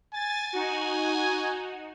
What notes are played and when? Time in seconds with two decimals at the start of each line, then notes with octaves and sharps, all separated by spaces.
0.14 G#5 A6
0.53 D#4 F#4